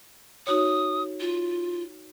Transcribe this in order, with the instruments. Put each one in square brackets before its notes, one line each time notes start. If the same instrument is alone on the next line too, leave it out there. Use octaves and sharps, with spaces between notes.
[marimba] D#4 F#4 C#5 [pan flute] D#6
[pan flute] F4